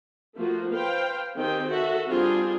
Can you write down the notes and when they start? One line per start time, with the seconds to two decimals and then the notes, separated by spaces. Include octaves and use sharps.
0.37 F3 A3 A#3 F4 F#4
0.70 B4 C5 F5 G5
1.36 D#3 C4 G4 G#4 G5
1.69 F#4 A4 E5
2.07 G3 C4 D4 F4 G#4